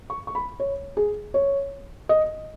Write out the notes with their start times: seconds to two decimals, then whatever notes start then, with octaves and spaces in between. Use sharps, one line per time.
0.10 C#6
0.27 C#6
0.35 B5
0.60 C#5
0.97 G#4
1.34 C#5
2.09 D#5